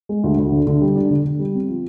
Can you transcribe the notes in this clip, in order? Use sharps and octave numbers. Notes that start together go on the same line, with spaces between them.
G#3
D2
D2
D3
D3
G3
D4
D3
D3
G3
C4
F3